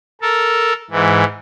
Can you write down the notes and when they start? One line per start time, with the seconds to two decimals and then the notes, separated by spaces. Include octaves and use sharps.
0.22 A4 A#4
0.91 G#2 E3